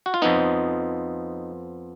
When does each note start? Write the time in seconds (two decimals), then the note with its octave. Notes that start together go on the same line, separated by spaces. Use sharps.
0.06 F#4
0.14 F4
0.22 F2 F3 B3 D#4